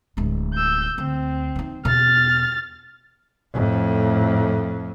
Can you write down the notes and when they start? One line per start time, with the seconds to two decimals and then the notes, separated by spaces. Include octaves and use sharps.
0.17 D1 G#3
0.54 E6 G6
0.98 D2 C4
1.56 E3 D#4
1.85 E2 B2 F6 A6
3.54 F2 A2